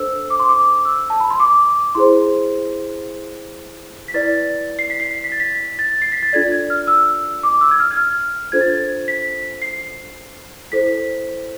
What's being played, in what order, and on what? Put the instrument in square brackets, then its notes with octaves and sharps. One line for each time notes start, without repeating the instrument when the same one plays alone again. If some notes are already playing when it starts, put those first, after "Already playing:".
Already playing: [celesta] D4 A4 C5 E6
D6
C6
D6
E6
A5
B5
C6
D6
E4 G#4 C5 C6
B6
E4 B4 D5 A6
C7
B6
C7
B6
A6
B6
A6
C7
B6
A6
D4 F4 A4 D5 G#6
G#6
F6
E6
D6
E6
G#6
F6
G#6
F6
D4 F4 A4 C5 G#6
A6
G#6
B6
C7
E4 A4 C5 B6